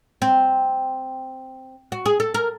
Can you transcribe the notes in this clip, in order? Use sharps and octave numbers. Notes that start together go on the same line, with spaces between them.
C4
F#4
G#4
A4
A#4